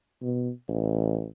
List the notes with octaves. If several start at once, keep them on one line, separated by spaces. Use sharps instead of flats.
B2
A1